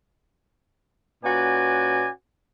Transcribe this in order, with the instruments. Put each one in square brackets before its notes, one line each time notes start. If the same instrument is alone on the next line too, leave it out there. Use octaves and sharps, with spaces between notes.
[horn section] A#2 C#4 F#4 B4 D5 G#5